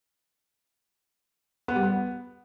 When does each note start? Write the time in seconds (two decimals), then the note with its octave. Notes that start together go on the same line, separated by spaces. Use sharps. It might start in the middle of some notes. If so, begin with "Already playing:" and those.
1.68 B3
1.76 G3
1.83 B3